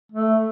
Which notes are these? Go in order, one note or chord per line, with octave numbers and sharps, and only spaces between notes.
A3